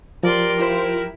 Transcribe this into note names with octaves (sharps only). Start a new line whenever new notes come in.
F3 G4 A#4 D5 C6
E4 F4 C5